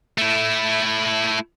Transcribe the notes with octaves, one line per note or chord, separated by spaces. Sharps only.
A3 E4